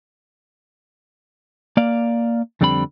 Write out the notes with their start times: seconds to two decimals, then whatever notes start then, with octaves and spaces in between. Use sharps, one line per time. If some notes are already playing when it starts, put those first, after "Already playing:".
1.77 A#3 D5 F5
2.61 F2 D3 G3 C4 A4 B5